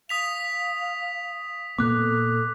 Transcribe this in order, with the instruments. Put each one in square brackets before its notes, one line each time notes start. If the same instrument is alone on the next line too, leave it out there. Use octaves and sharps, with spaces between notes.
[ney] F5 [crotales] D#6 B6 F7
[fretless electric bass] A#2 A#3 B3 [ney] A4 [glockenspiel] D6 F#6